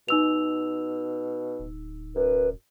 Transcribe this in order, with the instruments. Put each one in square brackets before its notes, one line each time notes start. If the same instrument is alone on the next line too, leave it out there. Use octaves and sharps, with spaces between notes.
[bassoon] B2 [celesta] D#4 E6 F7
[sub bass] D1
[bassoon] F#2 [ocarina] B4